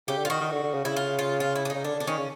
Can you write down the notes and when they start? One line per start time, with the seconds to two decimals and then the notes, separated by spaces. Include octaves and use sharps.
0.08 C#3 G4
0.18 D3
0.25 F4
0.30 D#3 F#4
0.41 D#3
0.52 D3
0.64 D3
0.74 C#3
0.85 C#3 E4
0.96 F4
1.19 F4
1.40 F4
1.56 E4
1.65 D4
1.70 C#3 D#4
1.85 D3 D4
1.96 D3 D4
2.07 D#3 C#4
2.18 C#3